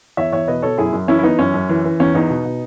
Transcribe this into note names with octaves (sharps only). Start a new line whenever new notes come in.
E2 C#5 E5
E2 C#5 E5
B2 B4 D#5
B2 A4 C#5
F#2 E4 G#4
F#2
E3 C#4 E4
E4
E3 B3 D#4
F#2 C#4
F#2
E3
E3
E2 C#4
E2 B3 D#4
B2
B2